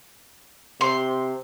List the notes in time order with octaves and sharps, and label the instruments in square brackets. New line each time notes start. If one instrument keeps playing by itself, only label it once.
[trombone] C3 [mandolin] C6